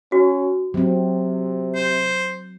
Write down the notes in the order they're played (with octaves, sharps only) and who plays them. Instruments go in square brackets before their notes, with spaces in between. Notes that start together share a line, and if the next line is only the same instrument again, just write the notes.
[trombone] C#4 [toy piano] F#4
[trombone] C3 [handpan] F#3 C4
[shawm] C5